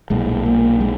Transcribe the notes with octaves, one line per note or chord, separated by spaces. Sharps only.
B1 A#2 G#3
A#3
G#3